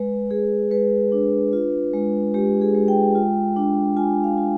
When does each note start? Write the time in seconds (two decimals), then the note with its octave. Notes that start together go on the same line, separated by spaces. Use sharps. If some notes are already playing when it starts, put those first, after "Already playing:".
Already playing: G#3 B4
0.30 G#3 G#4
0.71 G#3 B4
1.12 D4
1.53 F4
1.93 G#3
2.34 G#3 G4
2.61 G#4
2.75 G#3
2.88 G5
3.15 F4
3.56 D4
3.97 F4 G#5
4.24 F5
4.38 F4